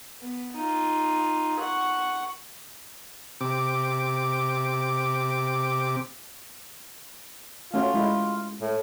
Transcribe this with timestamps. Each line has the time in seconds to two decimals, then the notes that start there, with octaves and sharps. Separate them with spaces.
0.21 B3
0.56 D#4 F4
1.60 F#5 C#6
3.41 C3 D6
7.74 A3 C#4 F4 F#4
7.94 G#3 E4
8.61 A2